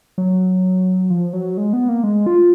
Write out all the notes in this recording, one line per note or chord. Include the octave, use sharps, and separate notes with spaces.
F#3
F3
F#3
G#3
B3
A#3
G#3
F4